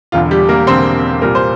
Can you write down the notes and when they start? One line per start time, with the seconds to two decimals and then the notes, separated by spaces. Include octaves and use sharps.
0.12 E1 E2 D3 F4
0.31 G3 G4
0.49 A#3 A#4
0.67 E1 E2 D3 C4 C5
1.22 C2 A#2 G3 A#4
1.35 C5